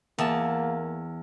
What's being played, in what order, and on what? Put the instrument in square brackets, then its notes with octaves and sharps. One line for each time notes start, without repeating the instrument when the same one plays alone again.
[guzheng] E2 A5 [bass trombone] A#3